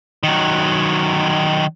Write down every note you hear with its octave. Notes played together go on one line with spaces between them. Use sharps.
D#3 F#3